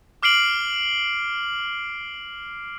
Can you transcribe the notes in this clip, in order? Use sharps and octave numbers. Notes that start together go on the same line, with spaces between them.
D6 F6 C7 D7 F#7